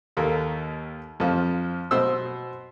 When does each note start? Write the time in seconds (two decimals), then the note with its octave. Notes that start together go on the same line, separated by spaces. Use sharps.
0.17 D#2 A#3 A4
1.20 F2 F3
1.91 B2 C5 E6